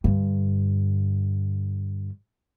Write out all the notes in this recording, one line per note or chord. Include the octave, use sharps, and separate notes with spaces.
G2 D3